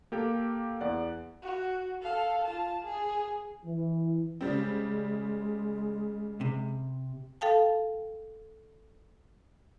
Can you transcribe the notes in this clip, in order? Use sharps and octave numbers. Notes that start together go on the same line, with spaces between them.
A#3 G4 A4 G5
E2 D5 F#5
F#4
A4 F5
F4 A5
G#4
E3
C#3 G3 G#3 C4
C3
A4 F5 G5 A5